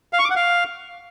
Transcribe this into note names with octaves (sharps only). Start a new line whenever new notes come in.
F5
C#6
D6
F#5
F5